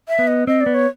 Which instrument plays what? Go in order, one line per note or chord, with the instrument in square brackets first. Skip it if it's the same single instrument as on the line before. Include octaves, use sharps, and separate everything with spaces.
[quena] E5
[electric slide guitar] B3
[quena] D#5
[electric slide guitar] C4 [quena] D#5
[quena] D5
[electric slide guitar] B3
[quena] C#5